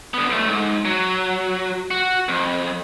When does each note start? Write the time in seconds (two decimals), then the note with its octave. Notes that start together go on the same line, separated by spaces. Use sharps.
0.14 D3 B3
0.29 B1 A3
0.48 G#2
0.85 F#3
1.91 F#4
2.28 F2